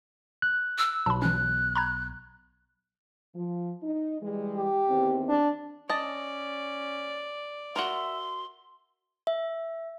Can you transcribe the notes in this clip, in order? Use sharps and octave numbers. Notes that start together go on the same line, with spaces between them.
F#6
E6
B1 A5 B5
E3 C#4 F#6
A#5 B5 G#6
F3
D#4
E3 G3 G#3
G4
E2 D#3 C4
D4
C#4 D5 D#5 A5
F#4 A#4 E5 C6
E5